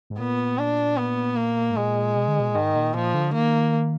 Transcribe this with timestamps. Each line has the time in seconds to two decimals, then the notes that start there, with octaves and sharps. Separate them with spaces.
0.10 G#2
0.19 A#2 B3
0.59 D4
0.98 B3
1.37 A#3
1.70 G#2
1.76 A#2 G#3
2.15 B2
2.28 D3
2.40 B2
2.49 A#2
2.55 G#2 D#3
2.75 A#2
2.94 A#2 F3
3.14 D3
3.34 D#3 A#3